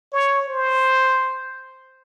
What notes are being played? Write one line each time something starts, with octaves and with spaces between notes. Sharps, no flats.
C#5
C5